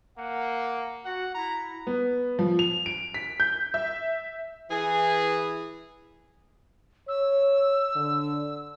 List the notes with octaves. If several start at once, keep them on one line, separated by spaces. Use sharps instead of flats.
A#3 F#5
F#4 F#5
E4 A#5
B3
F3
F7
D7
B6
G6
E5
E3 G#4
C#5 E6
D3